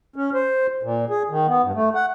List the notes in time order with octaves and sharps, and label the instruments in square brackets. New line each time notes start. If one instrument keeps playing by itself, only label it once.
[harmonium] C#4
C5
A#2
G#4
D#3
B3
G2
A3
F#5